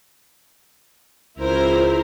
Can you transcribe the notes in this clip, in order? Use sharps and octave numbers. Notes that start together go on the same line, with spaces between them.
C#2 E4 A#4 C5